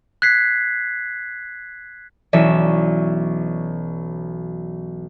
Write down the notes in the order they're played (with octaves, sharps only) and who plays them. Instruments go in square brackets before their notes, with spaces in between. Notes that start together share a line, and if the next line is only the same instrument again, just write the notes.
[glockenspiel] F#6 G#6 B6 C7
[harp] B1 E3 C#4 D5 E5